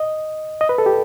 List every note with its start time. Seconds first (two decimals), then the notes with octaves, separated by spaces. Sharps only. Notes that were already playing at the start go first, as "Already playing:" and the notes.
Already playing: D#5
0.61 D#5
0.69 B4
0.78 A4
0.86 G4